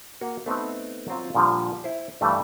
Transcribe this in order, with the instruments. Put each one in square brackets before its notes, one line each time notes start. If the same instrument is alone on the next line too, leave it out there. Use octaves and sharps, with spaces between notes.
[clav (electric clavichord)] A#3 F#4
A3 B3 C4 D#4
F#3 C4 F4
A#2 D3 F3 G3
E4 C5
G2 E3 G3 A3